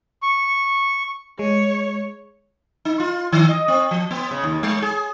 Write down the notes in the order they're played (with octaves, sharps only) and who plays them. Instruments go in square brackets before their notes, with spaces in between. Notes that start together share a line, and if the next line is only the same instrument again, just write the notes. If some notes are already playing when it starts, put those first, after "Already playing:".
[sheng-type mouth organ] C#6
[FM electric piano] G#3 [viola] C#5
[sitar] D#4
F4
D#3
D#5
C4
F3
B3
C#3
D#2
G#3
G#4